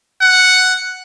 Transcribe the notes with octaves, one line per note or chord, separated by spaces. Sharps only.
F#5